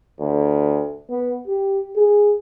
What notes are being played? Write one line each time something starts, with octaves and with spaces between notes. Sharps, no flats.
D2
B3
G4
G#4